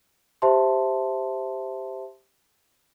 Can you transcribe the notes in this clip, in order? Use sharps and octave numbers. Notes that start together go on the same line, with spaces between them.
G4 C5 E5 A5 C6